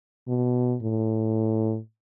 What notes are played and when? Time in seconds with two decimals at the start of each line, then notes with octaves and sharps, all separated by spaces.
0.28 B2
0.82 A2